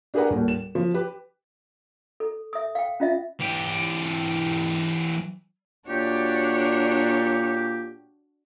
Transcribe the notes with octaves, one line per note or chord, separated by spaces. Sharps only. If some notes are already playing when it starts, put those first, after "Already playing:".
D4 G4 G#4 A#4 B4 F#5
D#1 D#2
E7
F3
G4 B4
A4
E5 D#6
F5 G5
C#4 F4 D#5 E5
E3 G4
A#2 D4 F#4 G4 C#5